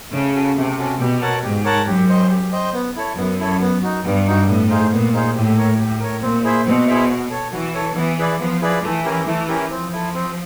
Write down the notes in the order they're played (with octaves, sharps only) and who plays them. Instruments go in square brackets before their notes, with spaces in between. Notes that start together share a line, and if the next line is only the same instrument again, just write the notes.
[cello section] C#3 [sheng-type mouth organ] A3
[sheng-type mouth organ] C#4 F#4 A4
[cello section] C3 [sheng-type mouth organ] A3
[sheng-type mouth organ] C#4 F#4 A4
[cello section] B2 [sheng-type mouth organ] G4
[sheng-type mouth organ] A#4 C#5 F#5 A5
[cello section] G#2 [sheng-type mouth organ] G4
[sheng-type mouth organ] A#4 C#5 F#5 A5
[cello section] F#2 [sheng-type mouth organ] G4
[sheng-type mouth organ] C5 D#5 G5
G4
C5 D#5 G5
B3
E4 A4 C#5
[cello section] F#2 [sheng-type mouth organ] B3
[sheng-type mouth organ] E4 A4 C#5
B3
D#4 F#4
[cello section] G2 [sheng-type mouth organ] B3
[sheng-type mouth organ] D#4 F#4
[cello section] A2 [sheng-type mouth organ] B3
[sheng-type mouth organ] D#4 G#4 C5 F5
[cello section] A#2 [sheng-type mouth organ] B3
[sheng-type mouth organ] D#4 G#4 C5 F5
[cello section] A2 [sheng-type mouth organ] G4
[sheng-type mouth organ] A#4 C#5
[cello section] A2 [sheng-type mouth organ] G4
[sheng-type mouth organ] A#4 C#5
[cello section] A#2 [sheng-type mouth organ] C4
[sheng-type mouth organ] E4 G#4 C5 E5
[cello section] B2 [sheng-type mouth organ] C4
[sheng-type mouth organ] E4 G#4 C5 E5
F#4
A4 C#5
[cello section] E3 [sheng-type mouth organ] F#4
[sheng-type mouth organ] A4 C#5
[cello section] E3 [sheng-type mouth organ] B3
[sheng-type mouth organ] E4 G#4 B4 D5
[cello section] F3 [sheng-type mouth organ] B3
[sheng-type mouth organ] E4 G#4 B4 D5
[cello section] E3 [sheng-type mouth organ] A3
[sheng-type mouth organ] C#4 E4 G4 A#4
[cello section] E3 [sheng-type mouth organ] A3
[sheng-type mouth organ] C#4 E4 G4 A#4
[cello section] F3 [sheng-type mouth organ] C4
[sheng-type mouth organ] E4 A4
C4